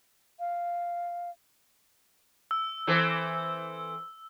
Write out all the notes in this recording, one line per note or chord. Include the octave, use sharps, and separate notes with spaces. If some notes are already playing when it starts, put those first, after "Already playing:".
F5
E6
E3 C4 A4